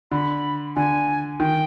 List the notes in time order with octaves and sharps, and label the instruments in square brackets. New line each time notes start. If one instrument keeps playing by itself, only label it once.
[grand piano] D3 [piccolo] B5
[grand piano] D3 [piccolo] G#5
[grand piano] D#3 [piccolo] G5